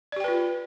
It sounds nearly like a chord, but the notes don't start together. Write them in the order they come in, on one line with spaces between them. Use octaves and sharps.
D5 G4 G5 B4 F4